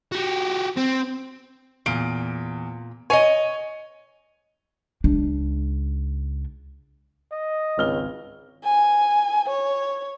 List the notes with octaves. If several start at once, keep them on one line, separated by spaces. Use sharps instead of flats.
F#4 G4
C4
E2 A#2 D7
C#5 D#5 G#5 C#7
C#2 D4
D#5
G#1 C#2 F6 G7
G#5
C#5